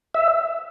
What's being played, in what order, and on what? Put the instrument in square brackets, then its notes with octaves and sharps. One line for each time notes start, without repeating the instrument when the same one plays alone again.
[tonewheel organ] E5